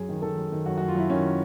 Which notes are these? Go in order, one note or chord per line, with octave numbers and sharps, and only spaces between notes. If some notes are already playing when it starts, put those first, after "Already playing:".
Already playing: F#2 G#4
D#3
D#3 A4
F#2
D#3
F#2 F#4
F#4
F#2
F4
F#2 E4
D#3 C#4